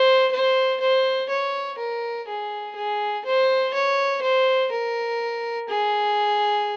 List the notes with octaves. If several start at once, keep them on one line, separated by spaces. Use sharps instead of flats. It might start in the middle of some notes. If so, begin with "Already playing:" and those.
Already playing: C5
C5
C5
C#5
A#4
G#4
G#4
C5
C#5
C5
A#4
G#4